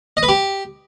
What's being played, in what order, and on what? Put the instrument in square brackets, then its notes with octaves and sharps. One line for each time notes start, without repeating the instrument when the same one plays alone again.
[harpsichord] D#5
B4
G4